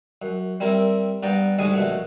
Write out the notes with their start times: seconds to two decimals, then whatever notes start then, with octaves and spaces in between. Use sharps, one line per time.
0.22 F#2
0.60 G3 C4 E4 A#4
1.23 G2 B3 D5 G5 A#5
1.59 D2 G#2 G3 G#4 D#6
1.73 A#1 B2 A3 F#5